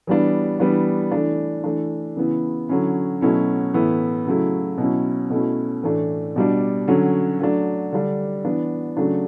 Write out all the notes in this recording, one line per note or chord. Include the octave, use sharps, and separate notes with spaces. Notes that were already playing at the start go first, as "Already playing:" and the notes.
E3 G3 B3 D4
E3 G3 B3 D4
E3 A3 D4
E3 A3 D4
C#3 E3 B3 E4
D3 F#3 C#4 E4
B2 F#3 A3 C#4 E4
A2 E3 B3 E4
C#3 F#3 A3 E4
B2 F#3 C#4 E4
B2 A3 C#4 E4
A2 E3 A3 D4
B2 G3 D4
D3 F#3 C#4
F#3 A3 D4
D3 G3 D4
E3 B3 D4
C#3 F#3 A3 D4